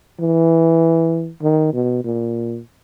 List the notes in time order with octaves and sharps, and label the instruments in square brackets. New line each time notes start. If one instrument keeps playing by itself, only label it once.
[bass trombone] E3
D#3
B2
A#2